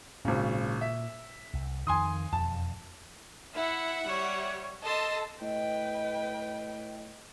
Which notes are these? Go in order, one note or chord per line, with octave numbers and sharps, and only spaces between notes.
G#1 A#2 C#3
E5
C2
F2 D#3 G#5 C6 D#6
E1 F2 A5
E4 E5 F#5
G3 C#5
A4 D#5 A5 C6
A2 B4 D#5 G5